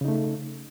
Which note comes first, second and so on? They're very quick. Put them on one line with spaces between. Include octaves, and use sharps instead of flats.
C#3 D#4 A3